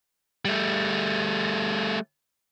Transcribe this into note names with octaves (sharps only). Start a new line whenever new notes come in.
G3 A3